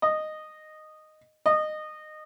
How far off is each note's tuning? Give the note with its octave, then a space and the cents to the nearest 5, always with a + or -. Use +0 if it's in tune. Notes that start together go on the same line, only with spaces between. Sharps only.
D#5 -10
D#5 -20